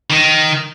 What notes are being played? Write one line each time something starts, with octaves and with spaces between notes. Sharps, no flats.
D#3